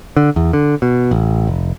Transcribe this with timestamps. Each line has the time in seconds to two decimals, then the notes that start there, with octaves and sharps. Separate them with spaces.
0.17 D3
0.36 E2
0.53 D3
0.82 B2
1.11 A1
1.47 F1